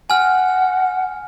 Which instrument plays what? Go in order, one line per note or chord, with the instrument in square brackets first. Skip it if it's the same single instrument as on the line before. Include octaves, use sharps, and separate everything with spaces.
[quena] F#5 [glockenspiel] G#5 F6